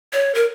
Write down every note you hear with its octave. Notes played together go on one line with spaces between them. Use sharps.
C#5
A#4